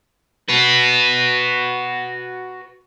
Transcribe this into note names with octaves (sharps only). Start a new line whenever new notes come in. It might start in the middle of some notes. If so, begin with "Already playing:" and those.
F#4 B4